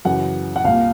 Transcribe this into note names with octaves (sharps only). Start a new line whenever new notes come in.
F#2 C#3 E3 F#5
F#5
C2 A#2 F5